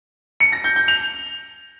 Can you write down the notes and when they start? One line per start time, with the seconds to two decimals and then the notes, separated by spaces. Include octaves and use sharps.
0.40 C#7
0.52 A#6
0.64 G6
0.76 G6
0.88 F7